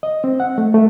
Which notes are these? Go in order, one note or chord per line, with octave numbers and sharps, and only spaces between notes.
D#5
C4
F#5
A3
A3